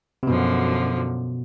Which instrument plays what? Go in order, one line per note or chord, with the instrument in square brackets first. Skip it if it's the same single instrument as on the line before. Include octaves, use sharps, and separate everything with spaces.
[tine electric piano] C3
[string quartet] F#2 D3 F3 [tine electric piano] B2